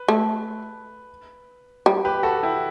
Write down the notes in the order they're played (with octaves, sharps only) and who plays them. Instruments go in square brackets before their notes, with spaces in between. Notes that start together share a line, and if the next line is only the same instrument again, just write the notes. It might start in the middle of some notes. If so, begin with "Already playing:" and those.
Already playing: [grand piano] B4
[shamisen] A3
G3
[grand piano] G4 B4
F#4 A4
E4 G4